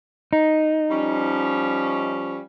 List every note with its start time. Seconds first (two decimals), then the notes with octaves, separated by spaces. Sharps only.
0.33 D#4
0.91 F3 G3 C#4